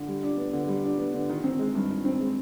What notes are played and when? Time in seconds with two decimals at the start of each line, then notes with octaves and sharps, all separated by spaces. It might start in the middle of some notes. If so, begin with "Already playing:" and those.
Already playing: D3
0.08 G3
0.23 D4
0.37 B3
0.53 D3
0.68 G3
0.84 D4
0.98 B3
1.14 D3
1.29 D#3
1.44 C4
1.59 G#3
1.75 G2
1.90 D#3
2.05 C4
2.20 G#3